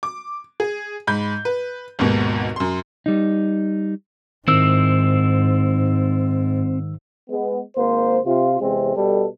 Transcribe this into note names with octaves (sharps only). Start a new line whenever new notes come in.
D6
G#4
G#2 B5 G6
B4
G#1 D#2 G#2 B2
F#2 C6
G3 D#4
G#2 D#3 C4 E4 E6
G#3 B3
G#1 A#3 C5
C3 F4
E2 C3 G#3 C4
B2 G3 A4